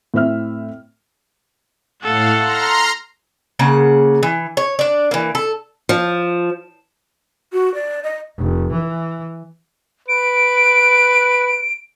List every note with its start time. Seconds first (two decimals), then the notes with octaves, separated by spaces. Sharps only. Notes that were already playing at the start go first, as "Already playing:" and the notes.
0.14 A2 C4 E5 F6
2.04 A2 A4 F5 F#5
2.40 A#5 C6 F6
3.59 C#3 A#3 F#5
4.23 E3
4.57 C#5
4.79 D4 D5
5.11 E3 A#3
5.35 A4
5.89 F3
7.53 F#4
7.75 D5
8.03 D#5
8.38 F1
8.71 E3
10.08 B4 D7